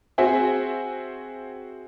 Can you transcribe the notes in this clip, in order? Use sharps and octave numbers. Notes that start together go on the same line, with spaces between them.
C4 F#4 G#4 C5 E5 G#5